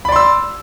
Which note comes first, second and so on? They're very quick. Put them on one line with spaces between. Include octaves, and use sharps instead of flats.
B5 D5 C6 E6